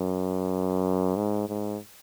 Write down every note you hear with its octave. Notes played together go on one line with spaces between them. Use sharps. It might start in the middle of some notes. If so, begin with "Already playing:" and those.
Already playing: F#2
G#2
G#2